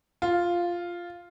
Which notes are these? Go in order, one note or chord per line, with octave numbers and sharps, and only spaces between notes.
F4